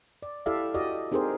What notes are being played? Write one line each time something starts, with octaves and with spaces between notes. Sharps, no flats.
D5
E4 G4 A4 D5 E5 F5
F#4 G4 D5 D#5
C4 D#4 G4 G#4 A#4 C5